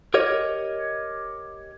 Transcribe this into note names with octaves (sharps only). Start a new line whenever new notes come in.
G4 A#4 C#5 D#5